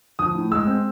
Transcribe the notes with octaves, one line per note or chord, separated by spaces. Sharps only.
F3 D#6
A2
G#3 E6
C4